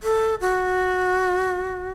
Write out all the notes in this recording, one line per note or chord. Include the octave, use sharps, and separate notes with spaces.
A4
F#4